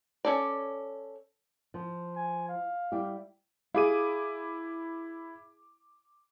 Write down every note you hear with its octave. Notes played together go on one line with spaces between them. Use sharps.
C#4 A4 D5
F3
G#5
F5
G3 E4 G4
E4 G#4 F5 D6 D#7